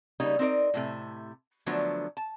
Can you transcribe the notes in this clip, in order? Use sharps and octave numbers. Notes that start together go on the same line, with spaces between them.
C#3 G3 A#3 D#4
C4 D#4 A#4 D5
A2 C3 A3
D3 F3 F#3 A3 B3 D4
A5